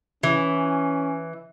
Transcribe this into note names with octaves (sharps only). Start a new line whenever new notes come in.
E3 C#4